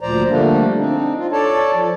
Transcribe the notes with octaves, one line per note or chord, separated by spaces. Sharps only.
D2 A#2 F3 C5 D5 A#5
D3 F3 G3 A3 A#3 D4
C4 D4 D#4
F4
A4 C#5 D5 A5
F3